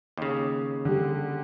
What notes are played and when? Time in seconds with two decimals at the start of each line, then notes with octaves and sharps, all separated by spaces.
0.17 D#2 C#3
0.85 D3 G3